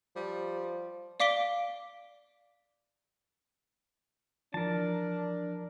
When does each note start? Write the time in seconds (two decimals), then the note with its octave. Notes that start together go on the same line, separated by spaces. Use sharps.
0.16 F3 G3
1.20 D5 F5 D6 B6 D7 G7
4.54 E3 F3 D4 A#4 A5